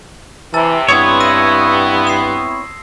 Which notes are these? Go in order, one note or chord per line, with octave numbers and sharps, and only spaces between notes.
C3 E3 A5 E6 A6
G2 B3 C4 E4 C#5 C6 D#6 G#6
E6 A#6 D#7
C7 E7